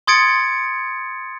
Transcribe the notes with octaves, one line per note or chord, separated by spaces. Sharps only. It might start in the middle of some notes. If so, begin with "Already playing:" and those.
C6 D#6 G#6 A6 C#7 D7